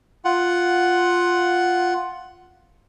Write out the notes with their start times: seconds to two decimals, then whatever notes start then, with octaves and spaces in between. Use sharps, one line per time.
0.25 F4 F#5